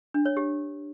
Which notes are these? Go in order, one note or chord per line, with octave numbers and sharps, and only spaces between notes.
D4
C#5
G4